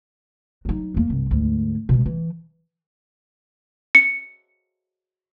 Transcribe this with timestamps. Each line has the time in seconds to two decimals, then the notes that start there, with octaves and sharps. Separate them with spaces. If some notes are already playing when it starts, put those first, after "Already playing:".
0.65 F#3 D#4
0.94 E2 A#3
1.10 C2 G2
1.31 D2 G#2
1.89 B2 G#3
2.06 E3
3.95 C#7